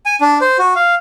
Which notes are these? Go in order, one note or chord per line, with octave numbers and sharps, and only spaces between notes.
G#5
D4
C5
F#4
F5